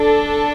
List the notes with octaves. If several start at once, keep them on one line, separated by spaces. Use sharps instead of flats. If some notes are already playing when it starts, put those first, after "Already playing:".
Already playing: D4 A4